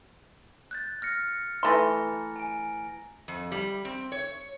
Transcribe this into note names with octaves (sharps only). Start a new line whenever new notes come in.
F#6 G6 A6
F6 A#6 C#7
E3 A3 A#5 C6 A#6
G#5 D7
F2
G3
C4
C#5